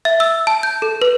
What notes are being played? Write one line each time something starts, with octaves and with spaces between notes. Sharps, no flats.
E5
E6
A5
G6
A4
B4